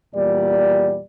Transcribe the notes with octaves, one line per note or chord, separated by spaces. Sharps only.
E2 A#2 G3 D5